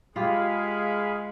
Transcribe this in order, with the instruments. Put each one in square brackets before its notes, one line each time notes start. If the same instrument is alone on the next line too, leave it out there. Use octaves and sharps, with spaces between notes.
[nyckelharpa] G#3 [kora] F4 G4 [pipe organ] G#4 F5 B5